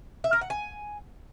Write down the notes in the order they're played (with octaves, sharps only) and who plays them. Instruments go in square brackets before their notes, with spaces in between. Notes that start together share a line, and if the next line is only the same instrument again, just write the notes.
[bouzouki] E5
A#4
F#5
G#5